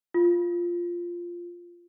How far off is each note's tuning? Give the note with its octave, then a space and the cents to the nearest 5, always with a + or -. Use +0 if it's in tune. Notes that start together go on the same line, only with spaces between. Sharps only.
F4 -5